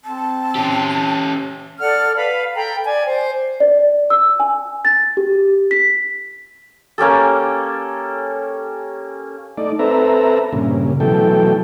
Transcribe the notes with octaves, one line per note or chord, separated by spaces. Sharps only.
C4 A5
C#4 G4
A4 D5 F#5 F6
B4 F5 B5
A4 G5 A#5 B5
D5 G#5
C5
D5
E6
G#5
A6
G4
B6
A#3 C#4 G4 A4
A3 D#4 D5
C4 A4 B4 E5 A#5
G2 A#2 C#3
B2 E3 F#3 A3 A4 G5